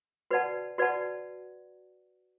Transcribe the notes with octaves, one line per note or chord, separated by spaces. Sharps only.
F#4 B4 D5 F#5 A5
F#4 B4 D5 F#5 A5